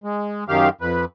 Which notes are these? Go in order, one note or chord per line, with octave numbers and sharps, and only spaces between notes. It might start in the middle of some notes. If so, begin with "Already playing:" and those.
G#3
F#2 D#3 G4 F5
F2 B4